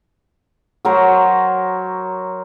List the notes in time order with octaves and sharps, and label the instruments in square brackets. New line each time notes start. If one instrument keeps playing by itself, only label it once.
[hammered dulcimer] F#3 A#4 C5 C#5